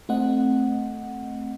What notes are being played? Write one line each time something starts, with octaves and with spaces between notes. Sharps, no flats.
A3 C4 D#5 F#5